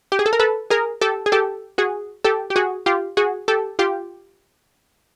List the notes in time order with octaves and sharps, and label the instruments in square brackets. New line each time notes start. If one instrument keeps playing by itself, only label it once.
[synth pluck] G4
G#4
A4
A#4
A4 B4
G#4 A#4
G4 A4
G#4
G4 A4
F#4 G#4
G4 A4
G4
F#4 G#4
F4 G4
F#4 G#4
G4 A4
F4 G4